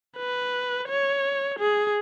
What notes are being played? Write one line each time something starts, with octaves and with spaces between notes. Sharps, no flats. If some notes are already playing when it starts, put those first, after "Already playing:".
B4
C#5
G#4